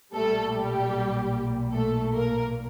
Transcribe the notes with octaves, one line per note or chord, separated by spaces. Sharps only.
B1 A#2 G3 A3 A4
G3 G4
A3 A4
A#3 A#4